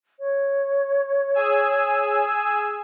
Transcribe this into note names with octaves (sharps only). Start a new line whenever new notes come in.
C#5
G#4 G#5 E6